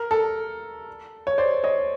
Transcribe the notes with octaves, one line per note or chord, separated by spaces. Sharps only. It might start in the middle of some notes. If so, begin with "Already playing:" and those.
Already playing: A#4
A4
C#5
C5 D5
C#5 D#5